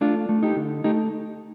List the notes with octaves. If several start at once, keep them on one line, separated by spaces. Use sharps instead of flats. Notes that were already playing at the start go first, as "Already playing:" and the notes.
A3 D4 F4
A3
D#4 G4
D3
A3 D#4 G4